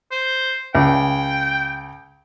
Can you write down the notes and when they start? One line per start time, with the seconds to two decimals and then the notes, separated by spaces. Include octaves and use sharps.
0.11 C5
0.75 C#2 G5